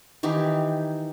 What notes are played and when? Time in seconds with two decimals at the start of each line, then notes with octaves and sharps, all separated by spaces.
0.23 D#3 E3 D#4 G4